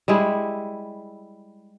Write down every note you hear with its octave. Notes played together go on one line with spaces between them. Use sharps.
G3 G#3 E4